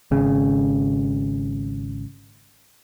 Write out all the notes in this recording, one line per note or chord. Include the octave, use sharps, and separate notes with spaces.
G#1 C#3